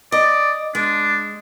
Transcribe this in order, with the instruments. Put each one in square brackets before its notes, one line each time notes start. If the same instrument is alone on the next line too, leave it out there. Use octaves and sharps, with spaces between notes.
[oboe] D5 [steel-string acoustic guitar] D#5
[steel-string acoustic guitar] G#3 [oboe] D4